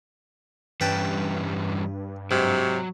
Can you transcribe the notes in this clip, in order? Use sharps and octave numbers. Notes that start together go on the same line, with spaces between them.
G2 E3 G3 C#4 B4 G5 A5
G#2 C3 F#3